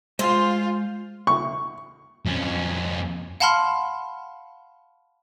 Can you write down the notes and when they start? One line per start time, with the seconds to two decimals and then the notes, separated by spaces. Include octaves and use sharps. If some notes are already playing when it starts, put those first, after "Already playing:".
0.19 G#3 F4 C5 G#5
1.27 C#6
2.26 F2 C#4
3.40 F5 F#5 A5 B5 C6 F6